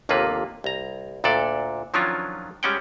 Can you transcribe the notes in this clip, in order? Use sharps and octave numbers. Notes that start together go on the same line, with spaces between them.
G1 D#2 C3 A#3 F4 B4
C2 A#5
D2 A#2 D4 A4 D5
D#3 F3 F#3 C#4 D4 F4
G3 G#3 C#4 F#5 G5